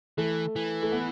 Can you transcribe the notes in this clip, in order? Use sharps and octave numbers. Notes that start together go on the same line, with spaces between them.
E3 A3
E3
A3
B3